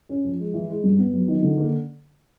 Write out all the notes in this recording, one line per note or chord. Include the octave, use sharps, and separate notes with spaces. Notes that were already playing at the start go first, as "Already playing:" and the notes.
C#4
F3
G#3
E3
G#3
G2
B3
F#3
D#3
D3
A#3